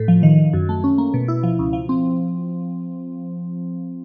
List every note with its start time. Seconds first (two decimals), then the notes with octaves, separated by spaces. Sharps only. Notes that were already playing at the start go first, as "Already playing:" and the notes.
Already playing: A2
0.08 F3
0.23 D#3
0.38 D#3
0.53 F#2
0.69 A3
0.84 C#4
0.98 A#3
1.14 B2
1.28 E4
1.43 F3
1.59 C#2
1.73 F3
1.89 C4